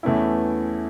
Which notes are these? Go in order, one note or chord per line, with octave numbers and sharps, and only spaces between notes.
E2 E3 A3 C#4 E4